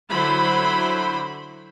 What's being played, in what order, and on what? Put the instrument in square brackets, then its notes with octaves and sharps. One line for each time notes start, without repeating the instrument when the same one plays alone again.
[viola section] D3 F#3 E4 C5 B5